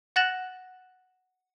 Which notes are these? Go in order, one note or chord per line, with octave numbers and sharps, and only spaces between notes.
F#5 F#6 A6 A#6 E7 F#7